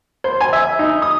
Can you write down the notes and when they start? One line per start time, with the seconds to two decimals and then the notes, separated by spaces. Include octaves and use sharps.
0.24 C5
0.41 G#5
0.53 E5
0.79 D#4
1.02 D#6